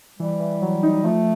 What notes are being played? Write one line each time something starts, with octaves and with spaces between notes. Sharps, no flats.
E3 G3
E3
F#3
D#4
F3 A3